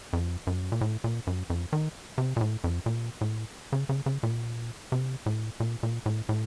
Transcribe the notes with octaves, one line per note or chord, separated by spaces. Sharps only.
F2
F#2
A#2
A2
A#2
F#2
F2
D#3
C3
A#2
A2
F2
A#2
A2
C#3
C#3
C#3
A#2
C3
A2
A#2
A#2
A2
A2